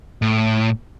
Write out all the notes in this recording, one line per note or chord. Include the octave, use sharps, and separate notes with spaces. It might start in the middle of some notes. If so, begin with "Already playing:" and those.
A2